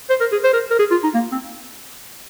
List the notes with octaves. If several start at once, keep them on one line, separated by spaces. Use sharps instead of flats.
C5
A#4
G#4
C5
A#4
A#4
G#4
F4
D#4
A#3
C4